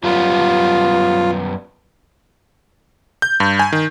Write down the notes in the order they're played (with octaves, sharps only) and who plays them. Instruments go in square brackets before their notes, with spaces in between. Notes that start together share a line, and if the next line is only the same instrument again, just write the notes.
[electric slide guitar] F#2 G3 B3 [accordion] F4
[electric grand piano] G6
G2
G#5
D#3